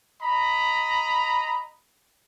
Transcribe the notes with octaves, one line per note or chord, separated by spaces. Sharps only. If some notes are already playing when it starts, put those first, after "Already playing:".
D#5 A#5 B5